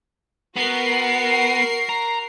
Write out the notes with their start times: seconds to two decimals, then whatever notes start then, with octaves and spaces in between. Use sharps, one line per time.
0.56 B3 F#4 A#4 C7
1.89 A#5